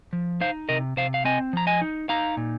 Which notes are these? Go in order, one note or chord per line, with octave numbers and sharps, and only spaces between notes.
F3
D#4 C5 F5
C3 A#4 D#5
C3 C5 F5
F5
C4 D#5 G#5
F3 A#5
D#5 G#5
D#4
D#4 F5 A#5
A#2